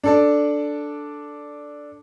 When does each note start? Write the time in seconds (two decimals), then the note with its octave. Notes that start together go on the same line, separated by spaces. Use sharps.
0.04 D4 A4 D5